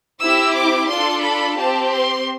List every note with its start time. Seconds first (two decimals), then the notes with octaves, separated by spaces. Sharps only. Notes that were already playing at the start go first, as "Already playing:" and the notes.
0.22 C4 E4 G4 E6
0.57 D6
0.90 D4 F4 A4 C6
1.23 B5
1.58 C4 G4 A5
1.92 C6